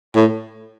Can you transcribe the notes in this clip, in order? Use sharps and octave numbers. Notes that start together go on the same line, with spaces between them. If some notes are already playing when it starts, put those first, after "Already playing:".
A2